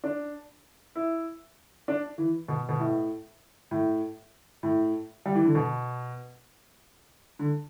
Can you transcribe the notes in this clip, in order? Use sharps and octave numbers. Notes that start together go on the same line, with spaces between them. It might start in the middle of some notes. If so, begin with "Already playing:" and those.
D4
E4
D4
E3
B2
B2
A2
A2
A2
G3
E3
D3
B2
D3